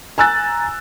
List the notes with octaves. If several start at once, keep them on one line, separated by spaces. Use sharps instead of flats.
G#5 A#5 E6 F#6 A6